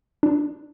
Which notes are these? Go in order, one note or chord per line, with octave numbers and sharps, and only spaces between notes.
D4